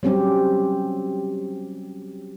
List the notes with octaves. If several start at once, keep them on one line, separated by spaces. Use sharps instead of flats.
F#3 G3 C4 C#4 G4